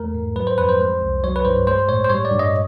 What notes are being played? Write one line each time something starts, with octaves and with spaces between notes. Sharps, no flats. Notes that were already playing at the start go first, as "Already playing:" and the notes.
Already playing: E2 A3 A#4
G#2
F#3 B4
C5
F2 B4
C5
G#3
C2
F#3 C#5
B4
G2 C5
G#3 C5
A2 C#5
C5
G3 C#5
D5
G2
D#5